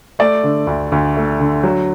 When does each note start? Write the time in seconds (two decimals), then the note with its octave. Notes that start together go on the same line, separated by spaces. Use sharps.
0.19 A3 D5
0.43 D3
0.67 D2
0.92 D2
1.16 A3
1.40 D3
1.63 F#3